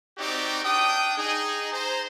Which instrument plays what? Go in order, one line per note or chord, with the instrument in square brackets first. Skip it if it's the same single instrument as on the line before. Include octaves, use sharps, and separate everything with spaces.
[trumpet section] C4 D#4 F#4 G4 D5
D4 G5 D#6
D#4 G#4
C5 A#5